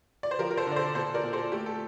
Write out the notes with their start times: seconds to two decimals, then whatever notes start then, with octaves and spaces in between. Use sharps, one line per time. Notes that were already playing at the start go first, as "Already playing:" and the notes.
0.23 D5
0.31 C5
0.39 F3 G4 A#4
0.51 A#4
0.57 A4 C5
0.67 D3 D5
0.76 A4 C5
0.95 A#2 A4 C5
1.14 A#4 D5
1.24 A#2
1.33 A4 C5
1.52 A3 G4
1.66 A4